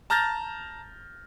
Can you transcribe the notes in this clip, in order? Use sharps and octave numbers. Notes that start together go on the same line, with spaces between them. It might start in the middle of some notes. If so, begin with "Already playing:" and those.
A5 A#5 F6 G6 A6 A#6